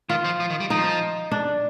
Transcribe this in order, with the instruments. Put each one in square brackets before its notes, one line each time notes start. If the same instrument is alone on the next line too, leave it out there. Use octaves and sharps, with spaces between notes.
[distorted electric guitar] D#3 [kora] F4
[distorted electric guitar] F3
F3
D#3
G3
[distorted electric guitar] F3 [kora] D#4
[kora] D4